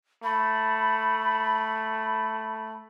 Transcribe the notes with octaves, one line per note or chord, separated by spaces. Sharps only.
A3 B5